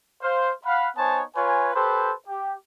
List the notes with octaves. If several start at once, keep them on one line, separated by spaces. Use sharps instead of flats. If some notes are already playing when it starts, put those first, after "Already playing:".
C5 F5
F5 F#5 B5
B3 D#4 C5 C#5 G#5 A5
F4 B4 C#5 G#5
G4 A4 B4 C5
G4